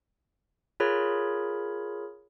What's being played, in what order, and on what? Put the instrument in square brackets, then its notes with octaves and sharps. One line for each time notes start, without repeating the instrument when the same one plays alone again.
[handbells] F4 G#4 A#4 C#5 B5